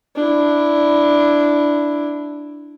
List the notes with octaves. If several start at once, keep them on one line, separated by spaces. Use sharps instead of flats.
D4 E4